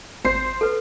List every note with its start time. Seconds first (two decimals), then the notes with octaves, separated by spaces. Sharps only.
0.25 G#1 C5 C7
0.61 A4 B4